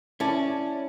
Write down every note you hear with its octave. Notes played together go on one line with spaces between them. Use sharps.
C#4 E4 D5 A5